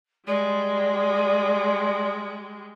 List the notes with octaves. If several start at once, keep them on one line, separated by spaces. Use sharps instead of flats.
G3 G#3 D5